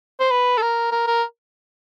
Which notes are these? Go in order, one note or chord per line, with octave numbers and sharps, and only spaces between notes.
C5
B4
A4
A#4
A#4
A#4